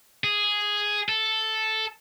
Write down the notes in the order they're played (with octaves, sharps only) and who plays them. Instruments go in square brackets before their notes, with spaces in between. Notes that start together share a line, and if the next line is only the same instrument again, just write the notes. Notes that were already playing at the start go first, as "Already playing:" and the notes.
[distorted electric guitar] G#4
A4